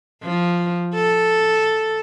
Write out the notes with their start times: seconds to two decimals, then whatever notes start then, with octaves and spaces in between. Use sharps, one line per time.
0.23 F3
0.95 A4